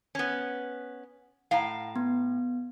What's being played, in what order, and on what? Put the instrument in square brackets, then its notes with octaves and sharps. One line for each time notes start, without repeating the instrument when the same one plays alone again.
[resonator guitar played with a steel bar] B3 C#4
[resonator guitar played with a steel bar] A2 F5 [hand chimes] F#5 A#5
[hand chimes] B3